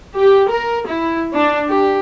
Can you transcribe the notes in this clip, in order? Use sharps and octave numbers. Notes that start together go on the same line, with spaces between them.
G4
A#4
E4
D4
G4